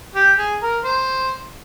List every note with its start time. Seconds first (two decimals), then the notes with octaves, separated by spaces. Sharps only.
0.15 G4
0.38 G#4
0.63 A#4
0.84 C5